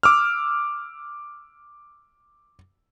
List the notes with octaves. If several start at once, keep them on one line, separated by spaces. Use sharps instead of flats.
D6 E6 F6